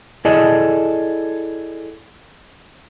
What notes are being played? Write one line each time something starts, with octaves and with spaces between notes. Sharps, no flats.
E4 G#4 A4 D5 D#5